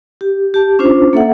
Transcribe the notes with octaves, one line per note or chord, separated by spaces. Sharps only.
G4
G4 A5
C#4 D4 F4 C5
A#3 A4 E5 F#5